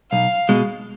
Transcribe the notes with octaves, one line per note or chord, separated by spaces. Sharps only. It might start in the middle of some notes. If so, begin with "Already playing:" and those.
B1 F5
B2 G#3